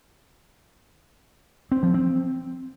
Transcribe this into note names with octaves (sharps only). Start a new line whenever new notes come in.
C4
F3
C4